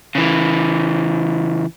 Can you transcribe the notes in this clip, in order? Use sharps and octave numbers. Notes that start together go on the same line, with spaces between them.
C#3 E3